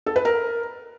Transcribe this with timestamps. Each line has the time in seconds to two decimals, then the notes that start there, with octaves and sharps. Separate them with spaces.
0.06 A4
0.16 B4
0.25 A#4